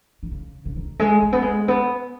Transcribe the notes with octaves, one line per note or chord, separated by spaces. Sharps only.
D#3
C#3
C#3
D#3
G#3
G#3
B3
G#3
B3